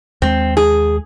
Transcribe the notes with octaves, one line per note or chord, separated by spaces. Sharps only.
D#2 G#3 C4
G#4